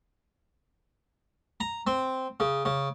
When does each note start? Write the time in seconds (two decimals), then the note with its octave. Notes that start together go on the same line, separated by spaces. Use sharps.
1.60 A#5
1.87 C4
2.40 C#3
2.65 C#3